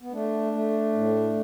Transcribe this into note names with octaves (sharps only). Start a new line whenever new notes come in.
B3
A3 D4
A3
A2